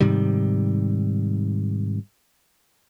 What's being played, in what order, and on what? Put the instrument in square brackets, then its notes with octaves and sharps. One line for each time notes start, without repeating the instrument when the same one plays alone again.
[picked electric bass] G#2 C3 D#3 G3